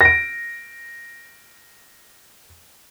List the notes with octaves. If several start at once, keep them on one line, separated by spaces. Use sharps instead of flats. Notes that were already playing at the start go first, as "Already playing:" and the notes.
A#6 D7